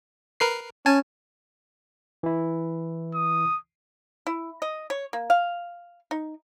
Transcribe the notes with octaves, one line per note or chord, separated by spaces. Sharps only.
A#4 B4 C7
C#4 G#5 A5
E3 E4
D#6
E4
D#5
C#5
A#3
F5
D#4